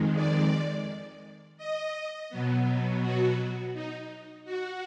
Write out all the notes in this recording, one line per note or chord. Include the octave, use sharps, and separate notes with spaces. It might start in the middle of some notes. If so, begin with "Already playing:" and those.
Already playing: F2 D#3 G#3
D5
D#5
B2 F#3 B3
F#4
D#4
F#4